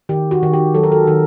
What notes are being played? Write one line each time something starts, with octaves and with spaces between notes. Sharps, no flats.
D#3 G4
F#4
D#3
G4
F#3 A4
A#4
A4
D#3